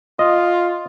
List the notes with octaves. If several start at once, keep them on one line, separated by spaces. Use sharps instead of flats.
F4 D#5